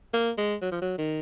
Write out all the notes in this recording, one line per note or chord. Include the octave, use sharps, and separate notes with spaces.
A#3
G#3
F#3
F3
F#3
D#3